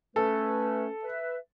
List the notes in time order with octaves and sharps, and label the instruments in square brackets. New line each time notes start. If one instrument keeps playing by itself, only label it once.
[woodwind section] A3 C#4 B4 [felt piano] A4
[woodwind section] B4 E5